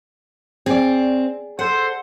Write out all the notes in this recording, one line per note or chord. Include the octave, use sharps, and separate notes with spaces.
C4 G#4 D5
A4 C5 F#5